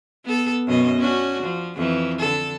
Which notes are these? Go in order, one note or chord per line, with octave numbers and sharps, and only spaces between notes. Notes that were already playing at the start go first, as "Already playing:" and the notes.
B3 A4
F#2 B2 D#5
C#4 D4 F#4
F3
F2 E3
D3 A4